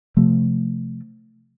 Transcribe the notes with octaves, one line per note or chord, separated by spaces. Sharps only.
C3 F3 A3